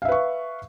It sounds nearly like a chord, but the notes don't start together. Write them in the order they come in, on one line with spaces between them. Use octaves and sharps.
F5 E5 B4 C#6